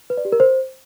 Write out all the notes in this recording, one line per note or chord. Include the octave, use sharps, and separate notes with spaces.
B4
D5
G4
A#4
C5